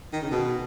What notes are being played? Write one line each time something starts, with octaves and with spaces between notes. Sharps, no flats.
D#3
C#3
B2